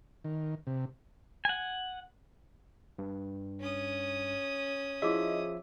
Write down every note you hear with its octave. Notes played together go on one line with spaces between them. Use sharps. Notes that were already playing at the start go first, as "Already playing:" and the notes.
D#3
C3
F#5 G#5
G2
C#4 D#6
F3 E4 F4 G#4 D#5 E5 D6